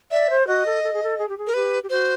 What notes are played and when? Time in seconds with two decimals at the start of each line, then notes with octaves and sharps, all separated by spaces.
0.11 D5 E5
0.30 C5
0.47 F#4 D#5
0.66 A4
0.83 A4
0.93 G#4
1.03 A4
1.18 G#4
1.29 G4
1.37 G#4
1.47 A#4
1.54 G4 B4
1.83 G4
1.90 F#4 C5